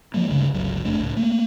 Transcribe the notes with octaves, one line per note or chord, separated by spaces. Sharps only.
F3 F#3 G#3 A#3
D2 G2 C#3
G1 C#2 F#3
F1 A3 D4
C#2 A2
A3 A#3